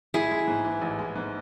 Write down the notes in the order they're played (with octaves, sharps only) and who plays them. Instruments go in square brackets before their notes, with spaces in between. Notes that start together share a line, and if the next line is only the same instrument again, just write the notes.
[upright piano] A1 [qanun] E4 G#4
[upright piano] G#3
G#2
E3
A1
G#3
G#2